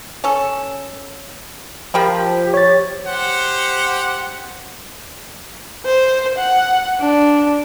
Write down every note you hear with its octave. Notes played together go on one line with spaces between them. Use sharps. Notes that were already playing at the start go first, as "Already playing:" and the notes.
C#4 A4
F3 G4 A#4 G5 B5
C#5 A6
G4 C5 F#5
C5
F#5
D4